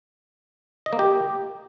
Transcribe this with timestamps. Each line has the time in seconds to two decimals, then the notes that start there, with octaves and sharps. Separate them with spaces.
0.86 D#5
0.93 A#3
0.99 G4